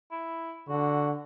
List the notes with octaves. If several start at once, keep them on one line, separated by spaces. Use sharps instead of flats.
E4
D3 F#4